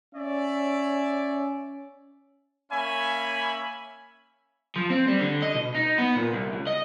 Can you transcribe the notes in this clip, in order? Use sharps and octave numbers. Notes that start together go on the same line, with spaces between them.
C#4 C#5 D5 E5
A#3 C#4 C#5 E5 G#5 B5
F3
C4
G3
D3
D#5
B2
D#4
B3
A#2
C2
C#2
D#5